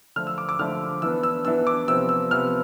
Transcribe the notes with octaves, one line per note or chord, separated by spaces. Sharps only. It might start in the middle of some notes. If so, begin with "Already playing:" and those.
D3 F3 A3 F6
E6
D6
D6
D3 F3 A3 F6
E3 B3 D4 E6
E6
E3 B3 D4 E6
D6
C3 F3 B3 E6
E6
C3 F3 B3 F6